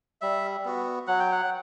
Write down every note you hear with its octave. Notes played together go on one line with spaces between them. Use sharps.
G3 E5
B3 F#4
F#3 F#5
G5
F#5